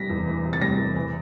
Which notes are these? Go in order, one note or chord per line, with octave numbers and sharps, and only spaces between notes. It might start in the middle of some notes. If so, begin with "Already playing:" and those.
Already playing: C3 E3 G3 A#6 B6
E2
E3
C3
A6
G3 A#6
E2
E3